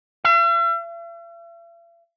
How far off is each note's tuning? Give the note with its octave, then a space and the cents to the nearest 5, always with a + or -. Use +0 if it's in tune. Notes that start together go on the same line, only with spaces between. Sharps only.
E5 +45